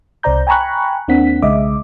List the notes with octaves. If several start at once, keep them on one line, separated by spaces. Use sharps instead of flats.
C2 C3 C5 D5 A#5 G6
G5 G#5 A#5 B5 C#6 F#6
D#2 A#3 C4 D4 F#5 B6
B1 C#3 G#3 D#5 E5 D6